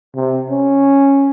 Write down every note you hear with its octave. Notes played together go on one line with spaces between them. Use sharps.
C3
C#4